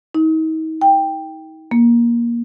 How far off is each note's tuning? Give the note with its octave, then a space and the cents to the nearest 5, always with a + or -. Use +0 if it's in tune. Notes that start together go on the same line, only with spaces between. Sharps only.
D#4 +40
G5 +5
A#3 +15